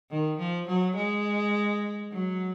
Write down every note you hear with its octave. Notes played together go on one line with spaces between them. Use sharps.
D#3
F3
F#3
G#3
F#3